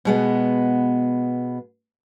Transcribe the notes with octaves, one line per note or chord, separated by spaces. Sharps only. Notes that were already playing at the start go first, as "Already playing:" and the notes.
B2 G#3 B3